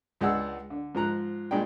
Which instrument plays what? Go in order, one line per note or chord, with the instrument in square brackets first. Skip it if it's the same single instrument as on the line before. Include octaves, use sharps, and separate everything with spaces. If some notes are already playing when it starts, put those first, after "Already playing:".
[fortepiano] C#2 G#3 D4 F#5 E6
D3
G#2 F3 A#5 F#6
G2 A#2 G#3 D4 G5